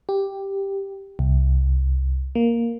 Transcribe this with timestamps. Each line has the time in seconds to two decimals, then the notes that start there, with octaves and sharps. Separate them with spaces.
0.09 G4
1.19 C2
2.35 A#3